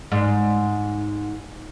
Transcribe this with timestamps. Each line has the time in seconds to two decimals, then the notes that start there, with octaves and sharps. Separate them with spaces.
0.12 G#2